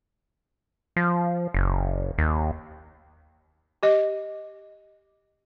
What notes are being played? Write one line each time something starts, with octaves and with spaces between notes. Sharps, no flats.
F3
F#1
D#2
G4 D#5